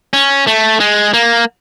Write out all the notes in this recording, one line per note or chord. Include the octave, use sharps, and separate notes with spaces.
C#4
A3
G#3
A#3